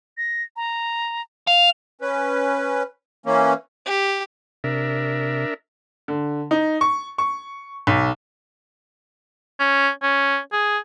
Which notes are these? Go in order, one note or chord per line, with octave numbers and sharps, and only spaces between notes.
A#6
A#5
F5 F7
C#4 B4
E3 A#3 C#4
G4
C3 D4 A#4 E5
D3
D#4
C#6
C#6
B1
C#4
C#4
G#4